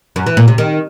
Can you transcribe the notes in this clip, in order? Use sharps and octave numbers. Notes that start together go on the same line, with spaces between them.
F#2
E3
A#2
C3
D#3